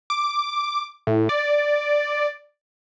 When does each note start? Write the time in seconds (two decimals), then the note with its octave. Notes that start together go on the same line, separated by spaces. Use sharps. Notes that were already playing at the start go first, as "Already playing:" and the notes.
0.10 D6
1.07 A2
1.29 D5